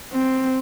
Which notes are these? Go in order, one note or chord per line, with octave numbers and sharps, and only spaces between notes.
C4